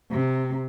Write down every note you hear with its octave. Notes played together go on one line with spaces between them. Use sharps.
C3